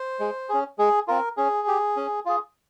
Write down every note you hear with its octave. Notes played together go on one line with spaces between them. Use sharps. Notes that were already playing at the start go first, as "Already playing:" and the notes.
Already playing: C5
G#3
C#4 G#4
G#3 G#4
C4 F4 A#4
C#4 G#4
G4
C#4
F4 G#4